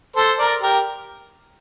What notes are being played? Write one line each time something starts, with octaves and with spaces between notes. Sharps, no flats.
A4 C5
A#4 D5
G4 A#4